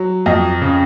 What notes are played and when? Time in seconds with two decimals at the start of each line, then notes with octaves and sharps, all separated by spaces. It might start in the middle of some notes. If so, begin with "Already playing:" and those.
Already playing: F#3
0.26 F2 D#5
0.62 C#3